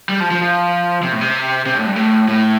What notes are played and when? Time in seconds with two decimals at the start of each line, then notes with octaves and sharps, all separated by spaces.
0.09 G3
0.20 F3
0.31 F3
0.41 F3
1.03 C3
1.12 A2
1.21 C3
1.66 C3
1.76 A2
1.87 G2
1.96 A2
2.28 A2